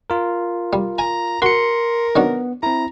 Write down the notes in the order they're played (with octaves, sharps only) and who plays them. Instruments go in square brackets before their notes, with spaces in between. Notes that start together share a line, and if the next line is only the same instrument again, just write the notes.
[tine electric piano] F4 A#4
[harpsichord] G3
[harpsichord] G#5 [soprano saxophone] A#5
[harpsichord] F#4 [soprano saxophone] A#4 [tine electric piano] C6 C#7
[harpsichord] D#3 F#3 D4 [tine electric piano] B3
[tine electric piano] C4 E4 [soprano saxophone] A#5